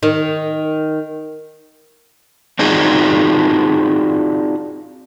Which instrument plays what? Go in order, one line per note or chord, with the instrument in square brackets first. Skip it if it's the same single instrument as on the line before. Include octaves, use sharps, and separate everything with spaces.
[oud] D#3
[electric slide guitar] C4 D4 D#4 F4 F#4 G#4